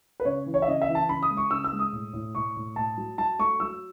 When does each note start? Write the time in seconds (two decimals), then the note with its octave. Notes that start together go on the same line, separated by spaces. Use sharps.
0.20 B4
0.25 C#3 C#5
0.46 E3
0.54 C#5
0.62 E5
0.68 C#3 D#5
0.82 E5
0.89 E3
0.95 A5
1.09 C#3 B5
1.23 D#6
1.30 G#3
1.37 C#6
1.51 C#3 E6
1.64 E6
1.72 G#3
1.79 D#6
1.92 A2
2.13 A2
2.35 A2 C#6
2.56 A2
2.76 A2 A5
2.97 F#3
3.18 F#3 A5
3.39 A3 C#6
3.60 F#3 E6